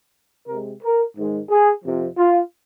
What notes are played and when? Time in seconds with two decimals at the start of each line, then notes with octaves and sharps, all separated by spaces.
0.48 C3 G#3 A#4
0.82 A#4
1.16 G#2 D#3 G#3
1.50 G#4
1.84 F2 C3 F3
2.18 F4